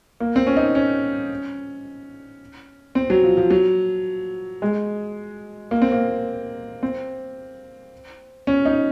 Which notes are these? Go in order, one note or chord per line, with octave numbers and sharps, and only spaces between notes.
A#3
C4
C#4
D#4
C#4
C4
F#3
F3
F3
F#3
G#3
A#3
C4
A#3
C4
C#4
D#4